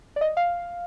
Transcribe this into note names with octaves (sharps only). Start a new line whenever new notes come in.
D5
D#5
F5